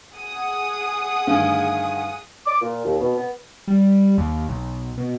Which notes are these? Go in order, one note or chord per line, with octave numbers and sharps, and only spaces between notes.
G#4 F#5 D#6
D2 G2 D#3 F5 G#5
D6
A#2
D#2
B2
B3
G3
D#2
B1
B2